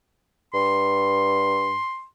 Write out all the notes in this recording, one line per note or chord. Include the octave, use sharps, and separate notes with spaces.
G2 C6